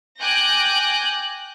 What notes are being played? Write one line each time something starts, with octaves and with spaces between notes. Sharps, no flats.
G5 G#5 D6 F#6 G6 A#6